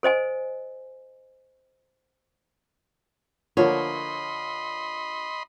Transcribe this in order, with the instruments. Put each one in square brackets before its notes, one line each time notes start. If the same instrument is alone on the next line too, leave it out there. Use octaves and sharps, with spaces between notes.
[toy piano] A4 C5 D#5 G#5
[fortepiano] D3 F3 A#3 [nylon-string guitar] C#5 [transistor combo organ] D#5 B5 C6